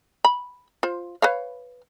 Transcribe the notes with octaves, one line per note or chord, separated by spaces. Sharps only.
B5
F4 C5
B4 C#5 F5